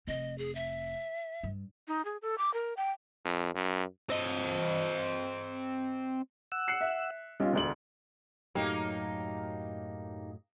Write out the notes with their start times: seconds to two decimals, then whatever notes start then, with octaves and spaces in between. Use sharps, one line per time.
0.07 F1 C4 D#5
0.38 G#4
0.55 E5
1.43 G2
1.88 D#4
2.05 G#4
2.22 A4
2.38 D6
2.54 A#4
2.77 G5
3.25 F2
3.55 F#2
4.10 C4 D#5
6.52 F#5 E6
6.67 F#6 C7 C#7
6.81 E5
7.40 B1 G3 C#4 F4
7.53 E1 D2 F#7
8.55 F#2 A2 F#3 A#3 D#4 G4